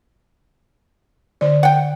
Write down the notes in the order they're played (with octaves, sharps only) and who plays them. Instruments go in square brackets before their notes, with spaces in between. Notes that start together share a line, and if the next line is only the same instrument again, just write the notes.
[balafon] D3 D5
[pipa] F#5 G5